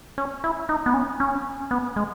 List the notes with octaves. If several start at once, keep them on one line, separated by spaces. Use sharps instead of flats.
C#4
E4
D#4
B3
C#4
C#4
B3
G#3